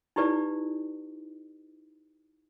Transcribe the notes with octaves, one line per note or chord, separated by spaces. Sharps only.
D#4 E4 G4 B4 D5